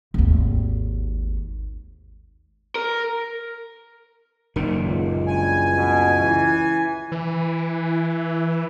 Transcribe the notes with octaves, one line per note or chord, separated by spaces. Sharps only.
G#1 D#2
A#4
F#1 A#2 D#3
C#2
G2 G#5
B2
E3
E3